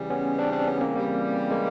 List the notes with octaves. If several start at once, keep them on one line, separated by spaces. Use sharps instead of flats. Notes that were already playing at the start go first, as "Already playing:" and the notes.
Already playing: C#3 E3 G3
B3 C#4
C4 D4
C4 D4
B3 C#4
A#3 C4
C#3 E3 G3
G#3 A#3